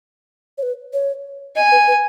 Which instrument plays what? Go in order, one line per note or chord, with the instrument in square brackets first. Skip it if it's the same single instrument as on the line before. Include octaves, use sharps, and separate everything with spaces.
[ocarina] C#5
B4
C#5
[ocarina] D#5 [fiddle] G#5
[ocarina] B4
B4